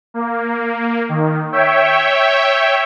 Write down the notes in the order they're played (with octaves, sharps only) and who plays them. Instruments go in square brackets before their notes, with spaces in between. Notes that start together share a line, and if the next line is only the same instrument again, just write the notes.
[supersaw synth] A#3
D#3
C#5 E5 G5